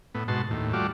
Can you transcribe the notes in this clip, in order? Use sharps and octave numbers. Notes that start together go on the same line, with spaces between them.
A2 B3
G#2 B2 F#4 A5 C6
D#2 A2
G3 A3 F4 F#4 D5